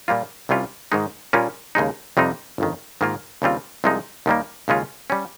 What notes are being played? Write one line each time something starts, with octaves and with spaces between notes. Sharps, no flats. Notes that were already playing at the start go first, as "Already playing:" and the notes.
A#2 G3 A#3 F4
C2 C3 G3 C#4 F4
G#2 D#3 G#3 D#4
A#2 G3 A#3 C#4 F4
D#2 C#3 G#3 D#4
F2 C3 G3 C4 D#4
G1 F2 D#3
G#2 D#3 A#3 F4
D#2 C#3 G3 C4 F4
C2 C3 F3 G#3 D#4
D#2 D#3 G3 A#3
D#2 C#3 G#3 C#4 F4
G3 C#4